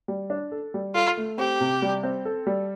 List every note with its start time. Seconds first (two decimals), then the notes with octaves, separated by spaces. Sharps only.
0.08 G3
0.30 D4
0.52 A4
0.74 G3
0.95 F4 A4
1.17 A3
1.38 C4 G4
1.61 C3
1.82 G3
2.03 C4
2.25 A4
2.47 G3